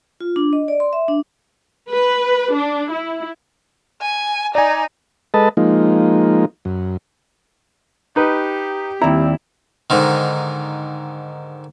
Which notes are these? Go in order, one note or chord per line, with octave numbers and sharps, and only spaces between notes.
F4
D4
D#5
D5
C6
E5
D4
B4
D4
E4
G#5
D#4 D5 G#5
G#3 A4 B4 D#5 A5
F3 G#3 A#3 D#4
F#2
D#4 G4 B4
D#2 G3 C4 E4 A#5
G#2 D3 D#3